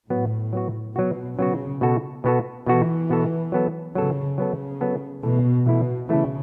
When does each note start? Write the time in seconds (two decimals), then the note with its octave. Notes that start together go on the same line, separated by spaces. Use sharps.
0.10 A2 F#3 B3 F#4
0.53 F#3 B3 F#4
0.96 B2 F#3 B3 F#4
1.38 C#3 F#3 B3 F#4
1.81 B2 B3 F#4 A4
2.24 B2 B3 F#4 A4
2.66 B2 E3 B3 F#4 A4
3.10 B2 B3 F#4 A4
3.52 F#3 B3 A4
3.95 C#3 F#3 B3 A4
4.38 C#3 F#3 B3 A4
4.81 F#3 B3 A4
5.23 B2 E3 A3 E4 A4
5.66 B2 E3 A3 E4 A4
6.09 C#3 E3 A3 E4 A4